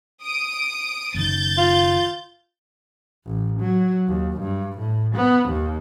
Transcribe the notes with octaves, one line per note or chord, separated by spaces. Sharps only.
D#6 D7
F#1 D#3 G6 A6
F4
A1
F#3
D#2
G2
A2
B3
D#2